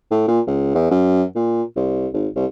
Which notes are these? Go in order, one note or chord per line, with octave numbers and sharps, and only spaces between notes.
A2
A#2
C#2
E2
F#2
A#2
C2
G#1
C2